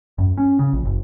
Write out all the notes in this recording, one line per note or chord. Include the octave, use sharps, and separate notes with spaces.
F#2
C#4
C#3
A#1
F#1